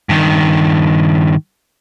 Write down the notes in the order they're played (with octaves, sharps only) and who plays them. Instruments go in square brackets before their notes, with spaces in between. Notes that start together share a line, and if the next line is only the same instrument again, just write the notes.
[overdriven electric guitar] G2 D#3